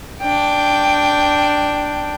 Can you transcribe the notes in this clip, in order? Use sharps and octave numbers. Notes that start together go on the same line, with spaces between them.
D4 G5